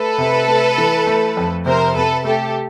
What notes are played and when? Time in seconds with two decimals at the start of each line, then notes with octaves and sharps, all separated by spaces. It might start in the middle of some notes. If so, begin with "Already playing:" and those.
Already playing: A3 A4 B4
0.18 C3
0.48 A3
0.78 E3
1.07 A3
1.37 F2
1.66 C3 A#4 C5
1.95 C3 A4 B4
2.25 A3 G4 A4